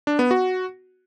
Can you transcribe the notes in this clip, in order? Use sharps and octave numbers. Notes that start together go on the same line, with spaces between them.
D4
B3
F#4